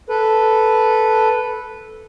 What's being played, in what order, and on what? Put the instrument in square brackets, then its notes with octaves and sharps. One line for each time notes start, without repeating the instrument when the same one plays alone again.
[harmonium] A4 B4